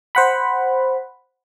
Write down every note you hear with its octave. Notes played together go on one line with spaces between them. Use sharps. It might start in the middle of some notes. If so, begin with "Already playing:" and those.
C5 F#5 B5